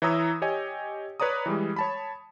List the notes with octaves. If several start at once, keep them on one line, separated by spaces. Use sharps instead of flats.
E3 E4 C#5 A#5 D#6 E6
G4 C#5 D#5 G#5
B4 C#5 D5 A#5 D#6
E3 G3 G#3
C#5 A5 B5